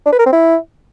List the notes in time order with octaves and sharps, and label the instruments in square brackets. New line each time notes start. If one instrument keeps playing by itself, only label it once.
[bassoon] D4
B4
A#4
C4
E4